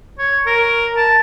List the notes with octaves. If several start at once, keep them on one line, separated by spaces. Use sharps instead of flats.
C#5
A#4
A5